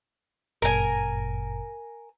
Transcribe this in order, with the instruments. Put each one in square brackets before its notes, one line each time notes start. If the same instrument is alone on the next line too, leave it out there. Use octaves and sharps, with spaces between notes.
[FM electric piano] G1 F#2 A#2 [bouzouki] A#4 G#5